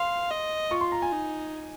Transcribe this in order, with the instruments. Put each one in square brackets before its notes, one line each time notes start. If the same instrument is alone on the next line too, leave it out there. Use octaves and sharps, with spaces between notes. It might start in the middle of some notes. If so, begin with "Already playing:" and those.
Already playing: [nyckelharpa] F5 [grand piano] C6
[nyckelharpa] D#5
[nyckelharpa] F4 [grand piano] C#6
[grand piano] C6
A#5
G#5
[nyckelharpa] D#4